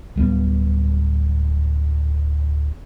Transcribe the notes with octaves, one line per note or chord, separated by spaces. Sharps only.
D1 G3 B3